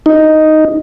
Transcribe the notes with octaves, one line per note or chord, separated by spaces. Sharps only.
D#4